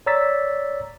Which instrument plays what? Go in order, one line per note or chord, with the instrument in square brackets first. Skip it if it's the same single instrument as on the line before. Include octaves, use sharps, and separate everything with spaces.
[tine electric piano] C#5 D5 A#5 E6 A6 B6